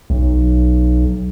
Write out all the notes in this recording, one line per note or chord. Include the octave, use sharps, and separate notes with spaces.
B1